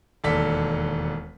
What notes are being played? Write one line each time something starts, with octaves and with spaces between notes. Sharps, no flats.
E1 D#2 A4 D5 B6